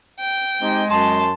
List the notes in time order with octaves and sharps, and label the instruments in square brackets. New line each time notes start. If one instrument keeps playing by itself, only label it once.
[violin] G5
[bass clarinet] G#3 [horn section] C4 D#4 G4
[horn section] F#2 C6 [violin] A5